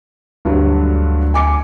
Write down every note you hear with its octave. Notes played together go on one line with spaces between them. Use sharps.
D2 G2 D3 F#3
G#5 D6 C#7